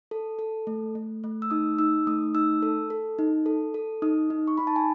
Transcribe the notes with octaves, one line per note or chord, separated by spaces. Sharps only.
A4
A4
A3
A3
A3
E6
D#4 D#6
D#4 E6
A3 D#6
D#4 E6
A4
A4
D#4
A4
A4
D#4 D#6
D#4
C#6
D#4 B5
A5
G#5